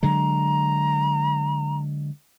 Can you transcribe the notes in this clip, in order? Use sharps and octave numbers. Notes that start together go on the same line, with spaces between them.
D3 F#3 G#3 A#5